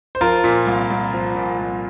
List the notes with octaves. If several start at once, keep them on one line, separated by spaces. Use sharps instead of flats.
C5
F3 F4 A#4
A#2
C2
C2
F3
A#2
C2